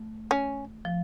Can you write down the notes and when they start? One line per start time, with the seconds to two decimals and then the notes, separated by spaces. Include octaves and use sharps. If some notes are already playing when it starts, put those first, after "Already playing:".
Already playing: A3
0.31 C#4
0.85 F3